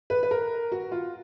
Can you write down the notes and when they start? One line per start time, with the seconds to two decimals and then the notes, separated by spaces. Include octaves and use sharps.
0.10 B4
0.23 B4
0.31 A#4
0.72 F#4
0.92 F4